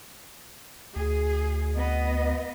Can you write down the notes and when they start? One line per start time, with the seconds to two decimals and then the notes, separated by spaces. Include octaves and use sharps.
0.96 D2 G#4
1.76 B3 D#5